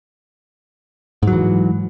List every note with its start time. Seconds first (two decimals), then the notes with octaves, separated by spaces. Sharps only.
1.23 G#2
1.27 F#3
1.32 E3